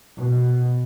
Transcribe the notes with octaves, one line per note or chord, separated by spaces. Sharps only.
B2